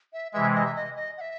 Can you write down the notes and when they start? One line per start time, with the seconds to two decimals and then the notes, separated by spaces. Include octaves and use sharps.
0.13 E5
0.33 C3 E3 G#3 E5
0.55 D#5
0.65 E5
0.76 D#5
0.96 D#5
1.17 F#5
1.21 E5